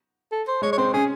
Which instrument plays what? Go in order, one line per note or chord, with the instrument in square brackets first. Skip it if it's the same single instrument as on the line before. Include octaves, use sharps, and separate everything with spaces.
[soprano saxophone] A4
C5
[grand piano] G#3 [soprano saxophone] C#5
[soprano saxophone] C#5
[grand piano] C4 [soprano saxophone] C5
[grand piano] C#4 [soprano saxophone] G#4